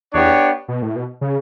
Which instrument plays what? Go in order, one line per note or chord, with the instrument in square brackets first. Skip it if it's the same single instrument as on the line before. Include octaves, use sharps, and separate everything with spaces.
[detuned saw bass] E2 [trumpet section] B3 D4 G4 C#5
[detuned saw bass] B2
A2
B2
C#3